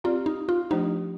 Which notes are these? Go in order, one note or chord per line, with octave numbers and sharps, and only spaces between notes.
C4 F4 G4 D5
D#4
F4
F3 A3 D4 D#4 G4 C5